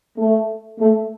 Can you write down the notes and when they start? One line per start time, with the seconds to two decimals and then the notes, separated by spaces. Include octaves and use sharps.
0.18 A3
0.79 A3